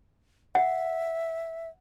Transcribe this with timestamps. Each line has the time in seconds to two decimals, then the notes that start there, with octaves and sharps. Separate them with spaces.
0.55 E5 F#5